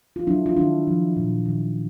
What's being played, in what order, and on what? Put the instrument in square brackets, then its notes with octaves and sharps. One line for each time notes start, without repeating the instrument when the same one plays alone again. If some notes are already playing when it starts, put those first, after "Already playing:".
[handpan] F4
F#3 D4 E4
F4
D#3 D4 E4
F3
A#2
D#3